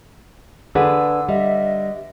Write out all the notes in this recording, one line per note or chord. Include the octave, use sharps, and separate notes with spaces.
D3 D4 G#4 B4 E6
G3 D#5 E5